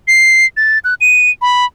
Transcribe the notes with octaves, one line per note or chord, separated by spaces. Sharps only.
C7
A6
F#6
D#7
B5